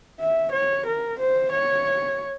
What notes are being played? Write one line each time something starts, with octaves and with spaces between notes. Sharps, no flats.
E5
C#5
A#4
C5
C#5